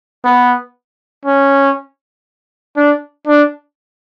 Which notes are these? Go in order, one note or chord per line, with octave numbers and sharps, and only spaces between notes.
B3
C#4
D4
D4